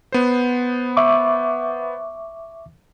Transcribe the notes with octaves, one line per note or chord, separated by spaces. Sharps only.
B3 C5
E5 C#6 D6